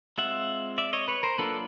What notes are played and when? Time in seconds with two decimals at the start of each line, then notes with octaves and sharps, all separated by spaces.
0.18 G#3 C4 F4 E5 F#5
0.78 D5 E5
0.93 C#5 D#5
1.08 B4 C#5
1.23 A#4 C5
1.38 F#3 A#3 D4 F4 A4 B4